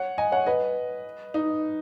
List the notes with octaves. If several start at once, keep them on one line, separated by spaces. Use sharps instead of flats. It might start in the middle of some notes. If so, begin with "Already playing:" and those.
Already playing: C#5 F#5
D#5 G#5
C#5 F#5
B4 D#5
D#4